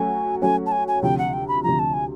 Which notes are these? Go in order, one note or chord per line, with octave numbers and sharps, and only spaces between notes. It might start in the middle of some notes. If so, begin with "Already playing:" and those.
Already playing: F#3 A3 C#4 F#4 G#5
F#3 A3 C#4 F#4 G#5
A5
G#5
G#5
D2 C3 F3 G5
F#5
G5
B5
D2 C3 F3 A#5
A5
G#5